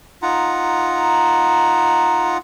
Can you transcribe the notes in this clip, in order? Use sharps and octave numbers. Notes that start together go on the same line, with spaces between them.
D#4 F4 F#5 A#5